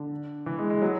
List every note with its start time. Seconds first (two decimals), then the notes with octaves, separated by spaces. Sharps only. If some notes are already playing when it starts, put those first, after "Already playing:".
Already playing: D3
0.46 E3
0.59 G#3
0.70 G#3
0.82 F#3